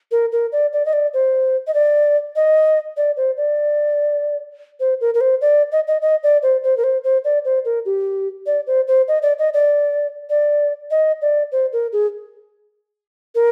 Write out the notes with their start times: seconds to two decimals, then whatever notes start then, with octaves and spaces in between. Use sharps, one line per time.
0.11 A#4
0.32 A#4
0.52 D5
0.73 D5
0.85 D#5
0.93 D5
1.13 C5
1.67 D#5
1.74 D5
2.36 D#5
2.97 D5
3.17 C5
3.37 D5
4.80 C5
5.01 A#4
5.14 A#4
5.21 C5
5.41 D5
5.72 D#5
5.87 D#5
6.01 D#5
6.23 D5
6.42 C5
6.63 C5
6.77 A#4
6.84 C5
7.04 C5
7.24 D5
7.45 C5
7.65 A#4
7.85 G4
8.46 D5
8.67 C5
8.87 C5
9.08 D#5
9.22 D5
9.38 D#5
9.54 D5
10.30 D5
10.91 D#5
11.22 D5
11.52 C5
11.73 A#4
11.92 G#4
13.35 A#4